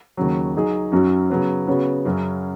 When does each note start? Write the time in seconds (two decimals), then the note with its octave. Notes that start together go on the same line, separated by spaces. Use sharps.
0.17 D#2 C#3 F#3
0.55 F#3 D#4 G#4
0.92 F#2 F#3 C#4 F#4
1.29 C#3 F#3 B3
1.67 C#3 B3 F#4 C#5
2.05 F#2 C#3 F#3 C#4